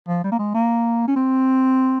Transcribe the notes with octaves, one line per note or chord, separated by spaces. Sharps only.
F3
G3
A#3
G#3
A#3
C#4
C4